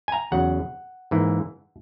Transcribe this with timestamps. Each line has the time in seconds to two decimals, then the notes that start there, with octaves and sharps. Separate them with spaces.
0.08 G#5
0.12 A#5
0.32 E2 C#3 F#3 F#5
1.11 G#2 E3 A#3